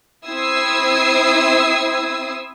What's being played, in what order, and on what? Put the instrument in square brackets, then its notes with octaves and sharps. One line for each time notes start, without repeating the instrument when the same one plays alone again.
[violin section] C4 E4 D#6 E6 G#6 C7